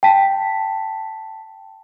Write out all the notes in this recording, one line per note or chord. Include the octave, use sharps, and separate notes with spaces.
G5 A5 B6